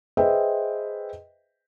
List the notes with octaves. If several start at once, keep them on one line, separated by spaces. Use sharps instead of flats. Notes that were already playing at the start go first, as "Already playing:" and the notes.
G#4 B4 C5 D#5 E5 G5